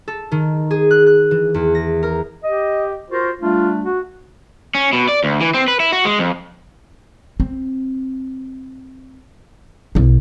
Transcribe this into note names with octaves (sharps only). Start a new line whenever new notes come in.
A4
D#3
G#4
F#6
F#6
E3
E2
A#6
A#4
G4 D#5
F4 F#4 A#4 C5
G3 A3 D4 F4
F#4
C#4
B2
D5
D2
E3
C4
B4
E4
F#4
G#3
F2
C4
B1 E4